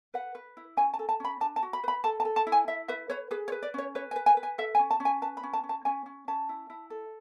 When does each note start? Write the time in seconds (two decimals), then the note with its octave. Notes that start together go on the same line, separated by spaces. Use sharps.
0.14 B4 F#5
0.35 B4
0.57 E4
0.77 C#4 G#5
0.94 A5
0.99 A4
1.09 A5
1.20 C#4 B5
1.40 D4 A5
1.56 A5
1.63 F#4
1.73 B5
1.84 B4 B5
2.04 A4 A5
2.20 A5
2.25 A4
2.36 A5
2.47 E4
2.52 G#5
2.68 E4 E5
2.88 B4 E5
3.10 B4 C#5
3.31 G#4 B4
3.48 C#5
3.52 B4
3.63 D5
3.74 C#4 C#5
3.95 B4 C#5
4.11 G#5
4.16 B4
4.26 G#5
4.37 B4
4.43 G#5
4.58 A4 E5
4.75 G#5
4.79 C#4
4.91 A5
5.00 C#4
5.05 G#5
5.22 B4 A5
5.37 B5
5.43 C#4
5.53 A5
5.63 C#4
5.69 A5
5.85 C#4 G#5
6.06 C#4
6.28 C#4 A5
6.49 E4
6.70 E4
6.90 A4